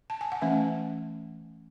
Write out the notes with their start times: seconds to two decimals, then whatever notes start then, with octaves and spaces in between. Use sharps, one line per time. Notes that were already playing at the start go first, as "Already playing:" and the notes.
0.10 A5
0.21 G#5
0.32 F#5
0.42 E3 A3 C#4 E5